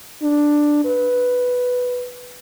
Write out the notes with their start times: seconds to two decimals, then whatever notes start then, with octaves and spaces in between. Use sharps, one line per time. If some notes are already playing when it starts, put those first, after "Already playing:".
0.23 D4
0.85 B4